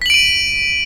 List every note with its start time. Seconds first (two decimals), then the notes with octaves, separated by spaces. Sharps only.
0.02 B6
0.06 F#7
0.10 D7
0.14 D#7